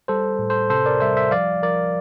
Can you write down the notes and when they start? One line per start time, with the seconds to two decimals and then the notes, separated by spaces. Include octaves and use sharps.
0.08 G3 A4 C5
0.39 A2
0.50 A4 C5
0.70 C3 A4 C5
0.86 A#4 D5
1.00 G3 C5 E5
1.17 C5 E5
1.31 F3 D5 F5
1.63 F3 A#4 D5